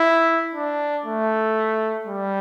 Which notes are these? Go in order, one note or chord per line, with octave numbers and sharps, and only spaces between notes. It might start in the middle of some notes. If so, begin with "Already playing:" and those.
Already playing: E4
D4
A3
G3